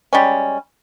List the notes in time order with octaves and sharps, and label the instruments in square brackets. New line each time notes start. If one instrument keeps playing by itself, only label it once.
[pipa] G3 G#3 C#4